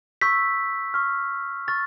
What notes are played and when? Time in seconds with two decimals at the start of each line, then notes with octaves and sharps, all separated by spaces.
0.21 C#6 E6 G6 B6
0.94 C#6 F6
1.68 C#6 F6 A6